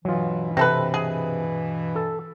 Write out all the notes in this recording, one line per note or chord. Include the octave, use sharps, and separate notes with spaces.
G2 B2 E3 F#3 F4
C3 C4 A4 B4
G#4
A4